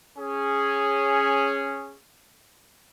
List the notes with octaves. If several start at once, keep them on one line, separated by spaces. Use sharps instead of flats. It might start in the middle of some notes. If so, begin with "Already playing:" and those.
C#4 G#4